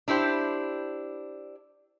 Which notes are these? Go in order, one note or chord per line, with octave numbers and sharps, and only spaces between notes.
D4 E4 G4 C5